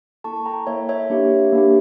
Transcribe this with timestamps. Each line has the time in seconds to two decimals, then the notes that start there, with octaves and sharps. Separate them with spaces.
0.24 A#3 E4 A4 A5 C#6
0.46 G5 A#5
0.67 A#3 E4 A4 C#5 E5
0.89 C#5 E5
1.10 A#3 D4 G4
1.53 A#3 D4 G4